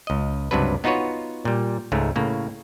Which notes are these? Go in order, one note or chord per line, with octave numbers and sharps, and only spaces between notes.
C#2 D#5
C#2 G2 C3 F#3 D4 B4
B3 D#4 F4 F#4 B4 C#5
A#2 G3
C#2 G#2 G#3 A3
A2 C#3 A#3